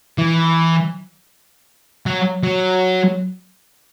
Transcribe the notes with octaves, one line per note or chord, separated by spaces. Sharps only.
E3
F#3
F#3